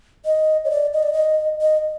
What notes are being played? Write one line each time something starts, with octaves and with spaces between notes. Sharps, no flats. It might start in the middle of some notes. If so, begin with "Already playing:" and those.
D#5
C#5
D5
D#5
D5
D#5
D#5